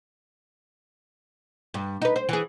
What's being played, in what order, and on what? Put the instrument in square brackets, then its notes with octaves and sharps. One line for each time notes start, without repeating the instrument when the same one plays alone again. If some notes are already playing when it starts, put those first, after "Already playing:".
[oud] G2
D#4 B4
C5
E3 G#4